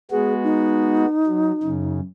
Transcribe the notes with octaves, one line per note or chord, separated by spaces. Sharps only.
G#3 B3 F#4 G#4
D#4
F#3
F#2 C#3